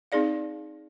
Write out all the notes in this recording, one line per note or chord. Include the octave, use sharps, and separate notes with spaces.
C4 D#4 G#4 D5 F5